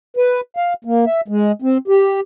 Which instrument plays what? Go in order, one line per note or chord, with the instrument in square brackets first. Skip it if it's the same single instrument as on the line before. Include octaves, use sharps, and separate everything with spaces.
[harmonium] B4
F5
A#3
E5
G#3
C4
G4